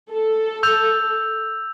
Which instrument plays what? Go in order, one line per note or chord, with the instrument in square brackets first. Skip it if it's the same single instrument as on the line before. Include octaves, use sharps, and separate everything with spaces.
[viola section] A4
[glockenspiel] E6 G6 F7